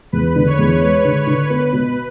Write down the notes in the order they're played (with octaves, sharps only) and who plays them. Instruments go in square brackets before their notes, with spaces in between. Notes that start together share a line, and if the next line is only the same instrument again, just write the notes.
[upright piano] E2 [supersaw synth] B4
[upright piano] D3
[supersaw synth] C#5
[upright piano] E2
[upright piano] G#3 [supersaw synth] B4
[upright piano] D3
[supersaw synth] C#5
[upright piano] D3
[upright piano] B3 [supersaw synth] B4
[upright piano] B2